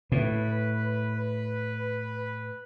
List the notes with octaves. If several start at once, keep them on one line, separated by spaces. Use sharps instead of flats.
A2 B4